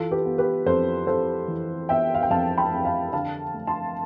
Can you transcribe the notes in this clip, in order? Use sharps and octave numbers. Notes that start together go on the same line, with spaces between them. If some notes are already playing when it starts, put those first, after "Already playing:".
Already playing: E3 F4 A4
G4 B4
B3
G4 B4
F2 A4 C5
F2 A4 C5
E3
B3 E5 G5
F5
G5
F2 F5 A5
G5 B5
F2
F5 A5
D3 F5 A5
A3
A5 C6